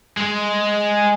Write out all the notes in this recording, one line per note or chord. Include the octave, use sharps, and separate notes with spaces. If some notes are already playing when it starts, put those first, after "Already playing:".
G#3